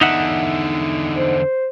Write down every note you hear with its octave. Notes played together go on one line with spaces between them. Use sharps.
E2 D3 D#4 E5 F#5
C5